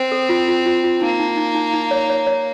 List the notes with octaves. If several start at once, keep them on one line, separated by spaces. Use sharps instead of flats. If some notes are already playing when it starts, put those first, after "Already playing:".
Already playing: C4 C5
A4
F4
F4
F4
F4
A#3 D#4
D#4
D#4
D#4
D#4
C#5
C#5
C#5